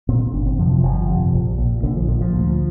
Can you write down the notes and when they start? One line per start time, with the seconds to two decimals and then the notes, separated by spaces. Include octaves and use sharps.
0.09 A#2 C4
0.21 C4
0.33 G1 D4
0.46 C4
0.58 F2 C3 F3
0.71 F3
0.83 G1 F3
1.09 F2 C3
1.33 A#1
1.58 A#2
1.83 A#1 D3
1.96 F3
2.08 A#2 F3
2.21 F3
2.33 D2